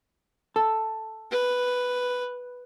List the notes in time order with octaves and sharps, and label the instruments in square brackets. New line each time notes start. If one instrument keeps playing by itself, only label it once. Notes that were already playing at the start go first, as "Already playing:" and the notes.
[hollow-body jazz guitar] A4 A5
[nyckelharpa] B4